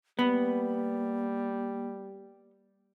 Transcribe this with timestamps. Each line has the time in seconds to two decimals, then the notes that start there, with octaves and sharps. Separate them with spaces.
0.19 G3 A#3 B3